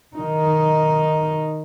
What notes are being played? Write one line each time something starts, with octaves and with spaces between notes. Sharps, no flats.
D#3 D#4